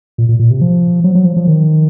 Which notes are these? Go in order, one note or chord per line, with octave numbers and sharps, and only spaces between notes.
A#2
A#2
A#2
C3
F3
F#3
F#3
F3
F3
D#3